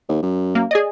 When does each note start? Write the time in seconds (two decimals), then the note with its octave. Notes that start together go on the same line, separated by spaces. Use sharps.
0.09 D#2
0.23 F#2
0.55 A#3
0.71 G#4 D5 D#5